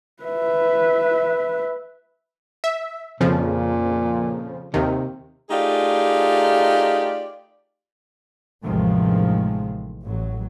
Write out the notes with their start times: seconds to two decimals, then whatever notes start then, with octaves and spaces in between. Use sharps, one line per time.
0.23 B4 E5
2.64 E5
3.20 F2 A#2 C#3 F3
4.74 D#2 C3 D#3
5.50 A3 D#4 F4 G4 G#4 D5
8.63 A1 E2 C3 D#3 F3 G#3
10.05 A1 F#3